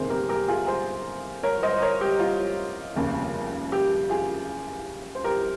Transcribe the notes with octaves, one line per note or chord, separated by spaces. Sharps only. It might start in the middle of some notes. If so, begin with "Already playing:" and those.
Already playing: G1 F2 C3 D#3 A#3 G#4 C5
G4 A#4
G4 A#4
F4 G#4
G#4 C5
A#4 C#5
C5 D#5
C5
A#4 C#5
G4
F4
F1 D#2 C#3
G4
F4 G#4
C5
G4 A#4